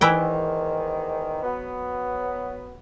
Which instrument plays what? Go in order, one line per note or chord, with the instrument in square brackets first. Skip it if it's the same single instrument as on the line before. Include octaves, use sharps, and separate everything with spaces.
[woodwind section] E2 G#2 D#3 [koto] E3 E4 G5
[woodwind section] F#3 B3